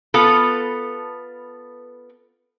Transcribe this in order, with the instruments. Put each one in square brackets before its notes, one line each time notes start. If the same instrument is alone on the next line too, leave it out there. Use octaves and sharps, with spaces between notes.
[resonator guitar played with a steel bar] B3 F4 A4